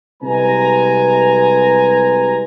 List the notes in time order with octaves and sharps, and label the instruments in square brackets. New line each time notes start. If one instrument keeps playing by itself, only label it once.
[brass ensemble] C2 C3 G#3 B4 G#5 A#5